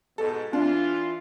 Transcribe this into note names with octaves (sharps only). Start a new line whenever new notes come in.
G#2 B2 A4
E3 D4 F4